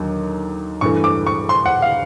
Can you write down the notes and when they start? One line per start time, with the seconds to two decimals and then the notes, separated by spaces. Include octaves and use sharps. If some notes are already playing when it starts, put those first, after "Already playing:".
Already playing: D#2 D3 F#3
0.81 G2 E3 A3 C#6
1.04 D6
1.27 C#6
1.49 C6
1.66 F#5
1.82 F5